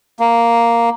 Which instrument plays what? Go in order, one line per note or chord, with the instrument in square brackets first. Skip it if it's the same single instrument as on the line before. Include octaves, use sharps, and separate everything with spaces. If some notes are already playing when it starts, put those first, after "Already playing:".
[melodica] A#3